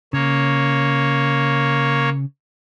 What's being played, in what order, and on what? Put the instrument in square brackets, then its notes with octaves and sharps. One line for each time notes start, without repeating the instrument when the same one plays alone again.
[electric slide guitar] C#3 [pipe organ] A#3 C#5